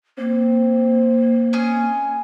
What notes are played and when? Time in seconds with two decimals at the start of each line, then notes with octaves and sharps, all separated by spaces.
0.18 A#3 C4
1.53 C#4 G#4 D#5